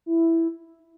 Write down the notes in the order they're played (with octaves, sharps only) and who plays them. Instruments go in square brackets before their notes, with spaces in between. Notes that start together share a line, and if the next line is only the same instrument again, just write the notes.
[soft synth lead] E4